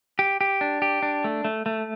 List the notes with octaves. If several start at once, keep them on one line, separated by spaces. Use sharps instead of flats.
G4
G4
D4
G4
D4
A3
A3
A3